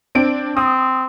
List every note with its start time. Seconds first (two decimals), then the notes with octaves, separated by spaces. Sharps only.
0.15 C4 D4 D7
0.57 C4 D#6